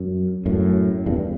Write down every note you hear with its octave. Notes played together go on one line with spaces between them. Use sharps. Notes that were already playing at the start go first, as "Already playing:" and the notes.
Already playing: F#2
F#2 A2
E2 G2